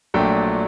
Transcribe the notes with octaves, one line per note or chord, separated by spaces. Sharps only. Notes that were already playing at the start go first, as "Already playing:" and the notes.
A#1 A#2 F#3 A3 D4 G5